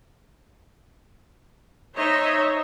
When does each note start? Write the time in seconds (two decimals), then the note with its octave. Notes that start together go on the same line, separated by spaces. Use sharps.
1.95 D#4 C5 C#5 D#5 E5